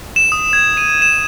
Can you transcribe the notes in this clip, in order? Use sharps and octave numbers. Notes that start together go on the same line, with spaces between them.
E7
D#6
G#6
D#7
E7